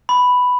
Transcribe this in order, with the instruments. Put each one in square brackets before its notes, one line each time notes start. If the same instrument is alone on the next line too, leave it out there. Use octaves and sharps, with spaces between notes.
[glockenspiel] B5